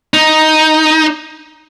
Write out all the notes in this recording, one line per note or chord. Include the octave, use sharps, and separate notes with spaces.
D#4